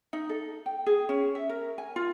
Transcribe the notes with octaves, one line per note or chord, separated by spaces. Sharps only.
D#4
A4
G5
G#4
C#4
E5
A#4
G#5
F4